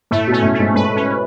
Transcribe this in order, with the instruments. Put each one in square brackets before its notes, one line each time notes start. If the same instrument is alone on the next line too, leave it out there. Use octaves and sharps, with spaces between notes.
[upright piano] A2 [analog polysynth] A3
[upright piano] B2 [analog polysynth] C#4
[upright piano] A2
[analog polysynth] A3
[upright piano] G#2
[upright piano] G#2 [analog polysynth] B4
[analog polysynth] C#4